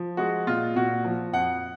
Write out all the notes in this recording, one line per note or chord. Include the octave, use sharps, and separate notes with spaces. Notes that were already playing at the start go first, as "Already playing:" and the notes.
Already playing: F3
G#3 F#4
A#2 F4
A#2 F#4
F3
F2 F#5